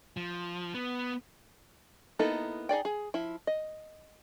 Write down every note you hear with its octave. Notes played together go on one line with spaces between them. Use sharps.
F3
B3
A#3 B3 D#4 E4 A4
D#4 G#4 D5 G5
G#4
F3 E4
D#5